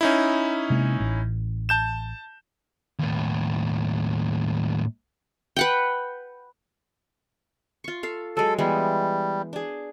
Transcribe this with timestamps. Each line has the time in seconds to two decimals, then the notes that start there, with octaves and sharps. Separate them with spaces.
0.01 C#4 D#4 E4
0.70 C3 G#3 A#3
1.00 A1
1.69 A5 G6 E7
2.99 D#2 A2
5.56 B4 F#5 G5
7.84 F4 C#6
8.03 A4 F5
8.37 F#3 G#3 A4
8.58 E3 G3 G#3 B3
9.53 D4 G#4